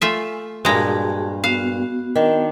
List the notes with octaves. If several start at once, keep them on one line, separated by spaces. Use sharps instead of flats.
A3 F4 E5 G#5
G2 A#2 G#3 F#4 G#4 A5 A#5
B3 F#4 F5
D#3 D4